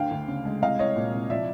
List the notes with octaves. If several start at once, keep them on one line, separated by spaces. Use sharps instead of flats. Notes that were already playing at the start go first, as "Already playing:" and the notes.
Already playing: D2 D3 F5 G5
D2
C#3
G#3
C2 D#5 F5
C2 C#5 D#5
A#2
C2
F3 D5 E5